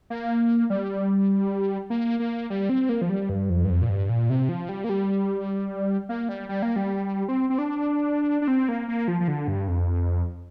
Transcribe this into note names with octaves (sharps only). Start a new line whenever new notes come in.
A#3
G3
A#3
A#3
G3
C4
A#3
F3
G3
G2
F2
G2
F2
A#2
G2
A#2
C3
F3
G3
A#3
G3
A#3
G3
G3
A#3
G3
C4
C4
D4
D4
C4
A#3
A#3
F3
F3
D3
G2
F2